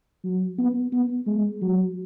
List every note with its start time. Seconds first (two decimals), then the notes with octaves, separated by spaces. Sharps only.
0.23 F#3
0.58 B3
0.93 B3
1.26 G#3
1.62 F#3